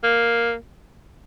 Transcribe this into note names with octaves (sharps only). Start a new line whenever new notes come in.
A#3